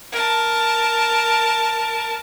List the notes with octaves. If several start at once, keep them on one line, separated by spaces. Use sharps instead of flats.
A#4 A5